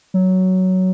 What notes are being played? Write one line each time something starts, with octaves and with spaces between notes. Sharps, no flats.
F#3